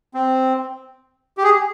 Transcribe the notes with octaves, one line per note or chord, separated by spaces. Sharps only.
C4
G4
G#4